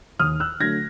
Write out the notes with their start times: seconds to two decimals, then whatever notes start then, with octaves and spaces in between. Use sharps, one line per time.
0.19 D#2 D#6 F6
0.40 E6 F#6
0.60 D3 F#3 A3 G#6 A#6